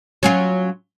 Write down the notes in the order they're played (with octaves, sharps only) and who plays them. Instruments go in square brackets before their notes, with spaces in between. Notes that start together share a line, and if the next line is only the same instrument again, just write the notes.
[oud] F#3 C#4 F4